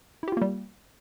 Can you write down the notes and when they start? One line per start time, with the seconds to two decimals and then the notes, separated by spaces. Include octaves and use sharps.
0.23 E4
0.28 G4
0.32 F4
0.37 A#3
0.42 G3